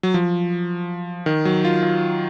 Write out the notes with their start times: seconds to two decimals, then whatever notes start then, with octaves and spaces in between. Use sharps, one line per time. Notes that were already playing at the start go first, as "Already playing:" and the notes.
0.03 F#3
0.14 F3
1.26 D#3
1.45 F#3
1.65 F4
1.83 F4